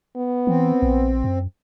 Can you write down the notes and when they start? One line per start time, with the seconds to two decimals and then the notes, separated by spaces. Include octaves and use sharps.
0.17 B3
0.47 E3 C4
0.82 A#1
1.24 F#2